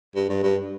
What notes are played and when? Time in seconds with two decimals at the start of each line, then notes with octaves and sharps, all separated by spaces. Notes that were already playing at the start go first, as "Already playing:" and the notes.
0.15 G2
0.29 G2
0.43 G2